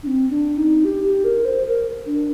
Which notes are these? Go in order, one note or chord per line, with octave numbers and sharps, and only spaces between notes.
D4
C4
D4
D#4
G4
G4
A#4
C5
A#4
D4